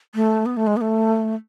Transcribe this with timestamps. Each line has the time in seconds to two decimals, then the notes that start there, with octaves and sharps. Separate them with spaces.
0.15 A3
0.46 B3
0.57 A3
0.67 G#3
0.77 B3
0.81 A3